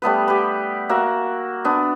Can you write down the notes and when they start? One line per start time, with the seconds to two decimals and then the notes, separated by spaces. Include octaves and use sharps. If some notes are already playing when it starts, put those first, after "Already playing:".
0.02 G3 A3 B3 B4
0.28 G4 B4
0.89 A#3 F#4 E5 F#5
1.65 B3 D4